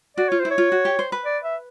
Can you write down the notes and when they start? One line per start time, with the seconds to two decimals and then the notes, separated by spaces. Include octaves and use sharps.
0.17 F#4 D5
0.29 F4 C#5
0.40 C5
0.45 E4
0.51 C#5
0.58 F4
0.72 F#4
0.85 G4
0.99 C5
1.12 B4
1.25 D5
1.43 E5